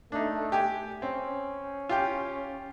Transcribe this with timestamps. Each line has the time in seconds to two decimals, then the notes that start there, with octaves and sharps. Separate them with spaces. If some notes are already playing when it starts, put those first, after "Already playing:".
0.12 A3 D4 D#4
0.52 G4 G5 G#5
1.02 C4 C#4
1.89 F4 G4 G5